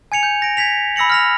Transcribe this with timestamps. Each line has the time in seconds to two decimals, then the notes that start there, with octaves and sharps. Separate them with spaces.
0.12 G#5 G#6 C#7 F7
0.23 G6
0.42 A#6 D7
0.57 G#6 A#6 B6 F7
0.96 B5 E6 A#6 C#7 F#7
1.10 F6 A#6 F7